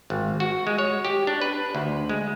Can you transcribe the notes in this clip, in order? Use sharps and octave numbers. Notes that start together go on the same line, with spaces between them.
G#1
F#4
G#3
C#5
G4
D4
B4
D2
G#3